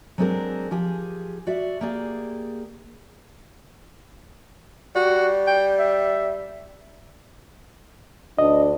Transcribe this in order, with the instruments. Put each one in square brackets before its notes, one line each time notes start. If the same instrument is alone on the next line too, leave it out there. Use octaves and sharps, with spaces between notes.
[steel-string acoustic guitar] F#3 G#3 C4 D4 G#4 A#4
F3 G4 G#4
F#4 D5 E5
A#3 G4 G#4 D5
[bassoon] G3 [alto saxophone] F#4
[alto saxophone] G5
E5
[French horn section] D2 D4 [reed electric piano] D#5